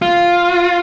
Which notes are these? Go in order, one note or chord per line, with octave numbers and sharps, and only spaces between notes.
F4